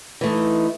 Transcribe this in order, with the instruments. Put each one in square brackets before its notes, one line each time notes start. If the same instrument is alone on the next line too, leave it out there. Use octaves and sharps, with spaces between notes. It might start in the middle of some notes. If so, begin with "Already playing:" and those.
[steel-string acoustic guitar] E3 A3 D#4